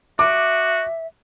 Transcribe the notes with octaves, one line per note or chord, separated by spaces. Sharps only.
F#4 E5 D6